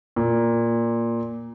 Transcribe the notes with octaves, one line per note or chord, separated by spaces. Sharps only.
A#2